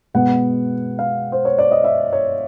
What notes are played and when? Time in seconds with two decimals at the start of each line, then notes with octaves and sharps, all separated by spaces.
0.14 B2 G#3 B3 F#5
0.99 F5
1.32 C5
1.45 C#5
1.58 D5
1.71 D#5
1.84 E5
2.13 C#5